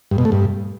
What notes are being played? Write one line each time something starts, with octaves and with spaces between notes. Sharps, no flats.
G2
B2
A3
G2